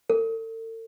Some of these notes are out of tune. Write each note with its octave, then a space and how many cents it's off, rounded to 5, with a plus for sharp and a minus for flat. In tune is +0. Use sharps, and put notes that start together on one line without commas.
A4 +45